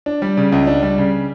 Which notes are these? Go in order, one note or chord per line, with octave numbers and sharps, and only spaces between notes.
D4
G3
C#3
C#2
D4
G3
C#3